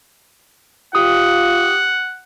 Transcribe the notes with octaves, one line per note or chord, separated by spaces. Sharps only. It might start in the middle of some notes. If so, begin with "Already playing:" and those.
F4 G4 F#5 D#6